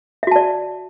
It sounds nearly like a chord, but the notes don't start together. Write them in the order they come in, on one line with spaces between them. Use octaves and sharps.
E5 F#4 A5 D5